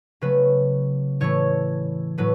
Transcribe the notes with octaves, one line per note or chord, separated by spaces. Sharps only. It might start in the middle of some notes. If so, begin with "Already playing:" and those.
C#3 F#3 A3 B4
A2 E3 A3 C#5
A2 F#3 A3 B4